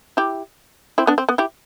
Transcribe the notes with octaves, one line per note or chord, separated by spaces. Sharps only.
E4 G4
C4 E4
B3 D4
C4
B3
E4 G4